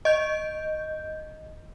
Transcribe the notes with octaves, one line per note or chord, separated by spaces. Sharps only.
D#5 G6